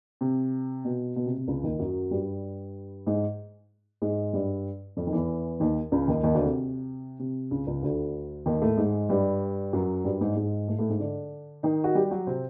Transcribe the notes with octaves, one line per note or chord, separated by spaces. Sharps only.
C3
B2
B2
C3
C3
C#2 C#3
D#2 D#3
F#2 F#3
G2 G3
G#2 G#3
G#2 G#3
G2 G3
F2 F3
D#3
E2 E3
D#2 D#3
C#2 C#3
D#2 D#3
D#2 D#3
D2 D3
C3
C3
C#2 C#3
C#2 C#3
D2 D3
D#2 D#3
A2 A3
G#2 G#3
G2 G3
F#2 F#3
G2 G3
G#2 G#3
G#2 G#3
A2 A3
A2 A3
G#2 G#3
D3 D4
D#3 D#4
F#4
G3 G4
F#3 F#4
C3 C4